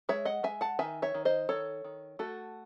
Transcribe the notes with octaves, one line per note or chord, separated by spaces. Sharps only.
G#3 C#5 E5
D#5 F#5
G#3 E5 G#5
F#5 A5
D#3 E5 G#5
C#5 E5
D#3
C5 D#5
D#3 A4 C#5
D#3
A3 F#4 A4